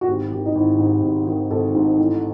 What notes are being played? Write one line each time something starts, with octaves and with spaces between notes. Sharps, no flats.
F#4
G#1 G4
D#3 G4
D#4
G#1 E4
G#2
G#1
D#3
G#1 A4
G#2
A1